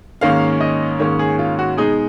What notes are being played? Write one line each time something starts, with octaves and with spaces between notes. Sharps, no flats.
G#2 D#3 A#3 C#4 F5
D#5
G#2 D#3 A#3 C#4 C#5
G#4
F4
F#4
B2 G#3 D#4 G#4